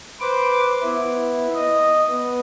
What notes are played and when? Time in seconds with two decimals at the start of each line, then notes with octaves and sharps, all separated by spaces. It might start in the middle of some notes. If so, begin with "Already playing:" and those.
0.21 B4 C5 D6
0.83 B3 E4
1.54 D#5
2.08 B3